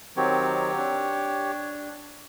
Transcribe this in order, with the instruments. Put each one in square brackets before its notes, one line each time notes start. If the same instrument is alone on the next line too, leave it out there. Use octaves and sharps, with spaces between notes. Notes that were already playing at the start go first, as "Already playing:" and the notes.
[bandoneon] D#3 F#3 C4 [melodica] G4 C#5
[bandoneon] D4